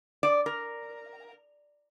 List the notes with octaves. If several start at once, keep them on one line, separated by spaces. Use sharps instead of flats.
D5
A#4